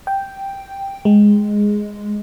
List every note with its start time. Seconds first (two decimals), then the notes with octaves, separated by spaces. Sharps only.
0.07 G5
1.05 G#3